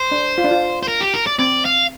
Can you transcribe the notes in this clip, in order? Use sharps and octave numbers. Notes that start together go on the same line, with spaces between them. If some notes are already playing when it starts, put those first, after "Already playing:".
Already playing: C5
D4
F4
D4
F4
C5
A#4
G4
A#4
D5
C4 D5
F5